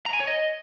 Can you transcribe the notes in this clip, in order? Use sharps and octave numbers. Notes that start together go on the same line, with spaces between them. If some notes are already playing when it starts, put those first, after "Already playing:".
A#5
G#5
C#5
D#5